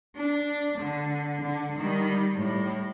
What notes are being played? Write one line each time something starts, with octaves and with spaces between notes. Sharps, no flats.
D4
D3
D3
D#3 G3
A2 G3